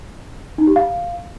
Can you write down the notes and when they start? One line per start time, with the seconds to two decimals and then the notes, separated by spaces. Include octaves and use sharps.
0.58 D#4
0.67 G4
0.76 F5